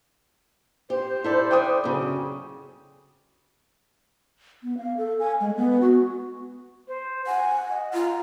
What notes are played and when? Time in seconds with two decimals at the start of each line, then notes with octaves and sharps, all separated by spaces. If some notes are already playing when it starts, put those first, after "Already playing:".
0.90 G4 C5
1.24 E4 A4 D5
1.51 G5 D6 D#6
1.84 F#2 C#3
4.63 B3
4.78 F5
4.97 A4
5.20 G#5
5.40 G#3
5.57 B3
5.81 F#4
6.88 C5
7.27 F#5 G#5
7.70 D#5
7.94 F4 A#5